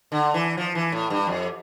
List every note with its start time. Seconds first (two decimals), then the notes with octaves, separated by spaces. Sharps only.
0.12 D3
0.34 E3
0.57 F3
0.75 E3
0.92 A2
1.10 G2
1.27 F2